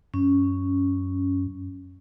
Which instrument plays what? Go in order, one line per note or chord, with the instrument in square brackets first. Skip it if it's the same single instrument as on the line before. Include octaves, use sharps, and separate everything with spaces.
[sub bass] F#2 [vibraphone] C#4